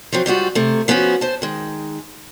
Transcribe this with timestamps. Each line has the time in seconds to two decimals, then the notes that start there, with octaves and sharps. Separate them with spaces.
0.12 F3 F#3 C4
0.26 G#2 G3 F4 F#4
0.55 C3 A3
0.88 F3 B3 C#4 F4 F#4
1.21 C5 A5
1.42 D#3 G#3